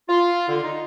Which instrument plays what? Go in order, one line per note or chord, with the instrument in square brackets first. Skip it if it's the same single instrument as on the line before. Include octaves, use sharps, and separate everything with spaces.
[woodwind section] F4
D3
D#4